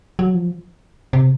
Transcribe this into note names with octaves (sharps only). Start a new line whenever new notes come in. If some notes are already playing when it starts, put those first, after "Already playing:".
F#3
F3
C3